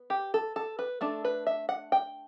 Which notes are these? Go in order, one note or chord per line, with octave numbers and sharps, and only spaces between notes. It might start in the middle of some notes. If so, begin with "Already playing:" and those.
Already playing: B3
G4
A4
A4
B4
A3 D4 A4
B4
E5
F#5
G5